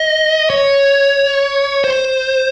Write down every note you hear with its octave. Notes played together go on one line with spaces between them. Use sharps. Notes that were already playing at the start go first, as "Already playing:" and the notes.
Already playing: D#5
C#5
C5